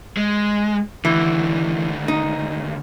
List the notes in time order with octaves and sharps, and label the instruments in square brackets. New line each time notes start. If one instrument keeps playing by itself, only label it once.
[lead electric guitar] G#3
[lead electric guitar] D#2 D3 [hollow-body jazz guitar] E3
[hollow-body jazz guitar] D#4